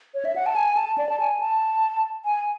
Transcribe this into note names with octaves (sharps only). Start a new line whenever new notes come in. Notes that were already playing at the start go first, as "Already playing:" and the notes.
C#5
E5
F#5
A5
G#5
G#5
A5
D5
A5
G#5
A5
G#5